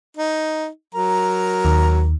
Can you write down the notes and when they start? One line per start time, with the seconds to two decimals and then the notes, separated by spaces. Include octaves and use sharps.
0.17 D#4
0.95 F#3 A#4 A#5
1.65 D#2